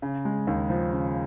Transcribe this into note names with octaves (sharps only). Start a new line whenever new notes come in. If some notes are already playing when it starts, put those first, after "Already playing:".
C#3
G#3
D#2
F3
C#3